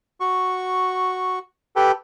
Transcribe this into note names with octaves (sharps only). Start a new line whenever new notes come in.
F#4 C#6
G4 A4 B4 G5